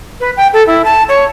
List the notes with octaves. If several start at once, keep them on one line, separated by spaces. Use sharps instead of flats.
B4
G5
A4
E4
A5
C#5